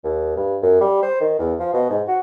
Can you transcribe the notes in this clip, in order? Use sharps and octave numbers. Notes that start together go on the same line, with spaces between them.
D#2
G2
F#2
G3
C5
D#3
E2
F3
B2
G#2
F#4